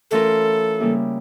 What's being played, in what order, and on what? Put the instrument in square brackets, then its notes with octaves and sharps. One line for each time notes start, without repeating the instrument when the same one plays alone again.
[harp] E3 A3 C#4 F4 A#4 [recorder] A4
[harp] C#3 G3 A#3 E4 G4